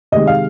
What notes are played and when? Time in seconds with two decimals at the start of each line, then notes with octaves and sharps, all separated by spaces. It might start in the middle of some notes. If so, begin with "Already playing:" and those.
0.12 C3 D#3 G#3 D#5
0.27 F5